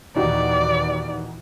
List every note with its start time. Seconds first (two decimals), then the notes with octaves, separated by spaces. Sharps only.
0.16 D#2 A#2 E3 D#4 F#4 G4 D5